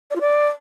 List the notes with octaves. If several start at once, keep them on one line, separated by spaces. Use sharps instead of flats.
D5
F4
D5